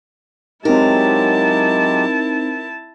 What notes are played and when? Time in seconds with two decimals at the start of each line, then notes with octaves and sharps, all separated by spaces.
0.65 F#3 G#3 C4 D#4 E4 G4 A#4 A5